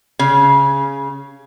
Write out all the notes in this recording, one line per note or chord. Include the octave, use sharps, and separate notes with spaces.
C#3